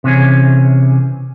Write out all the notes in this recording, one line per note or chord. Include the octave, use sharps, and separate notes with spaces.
C3 E3 C#4 G#4